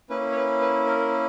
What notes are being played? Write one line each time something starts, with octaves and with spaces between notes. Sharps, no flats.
A#3 C#4 E4 B4
C#5
B4
B4
A#4